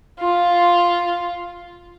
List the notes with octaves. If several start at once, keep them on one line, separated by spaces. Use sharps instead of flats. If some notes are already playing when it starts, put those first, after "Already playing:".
F4